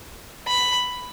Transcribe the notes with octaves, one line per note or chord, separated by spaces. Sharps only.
B5